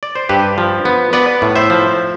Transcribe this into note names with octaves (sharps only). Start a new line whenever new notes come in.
D5
C5
G2 G4 B4
F3
B3
B3 B4 D5
A2
C5 E5
F3